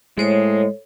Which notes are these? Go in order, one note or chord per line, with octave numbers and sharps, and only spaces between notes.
A2 G#3 A4 C5 C#5